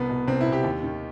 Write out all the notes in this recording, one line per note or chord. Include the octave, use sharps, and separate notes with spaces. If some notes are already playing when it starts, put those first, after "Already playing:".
Already playing: C2 B3
B2
C2 C4
E4
B2
G4
D#2
D#3